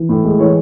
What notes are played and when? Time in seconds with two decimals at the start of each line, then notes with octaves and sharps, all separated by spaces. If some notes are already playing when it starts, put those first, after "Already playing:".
Already playing: E3
0.09 A2
0.24 G#3
0.40 E3 C#5